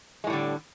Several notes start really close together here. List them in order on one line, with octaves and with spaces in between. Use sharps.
G#3 A2 G3 D3